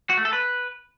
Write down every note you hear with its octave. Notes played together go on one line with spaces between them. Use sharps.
F#4
A3
A4
B4